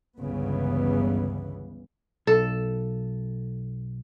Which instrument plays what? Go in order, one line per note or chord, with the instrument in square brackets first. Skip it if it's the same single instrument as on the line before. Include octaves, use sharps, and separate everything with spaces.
[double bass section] G1 C#2 C#3 E3 B3
[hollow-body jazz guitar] B1 [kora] A4